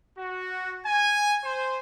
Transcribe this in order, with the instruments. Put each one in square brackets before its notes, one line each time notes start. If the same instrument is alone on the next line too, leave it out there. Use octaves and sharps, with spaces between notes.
[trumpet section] F#4
G#5
C5